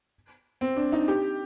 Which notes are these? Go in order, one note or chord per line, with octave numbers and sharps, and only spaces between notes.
C4
D4
D#4
G4